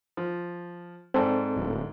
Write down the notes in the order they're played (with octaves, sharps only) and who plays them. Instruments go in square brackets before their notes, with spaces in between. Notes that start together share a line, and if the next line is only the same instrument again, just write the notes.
[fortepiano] F3
[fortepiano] G#2 D5 [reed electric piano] C4 A4
[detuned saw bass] D1